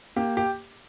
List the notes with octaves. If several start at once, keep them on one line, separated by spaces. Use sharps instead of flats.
A#3 G4
G4